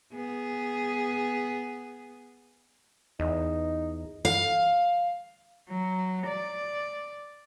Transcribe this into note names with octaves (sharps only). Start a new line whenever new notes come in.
B3 G#4
E2 D#4
F5
F#3
D5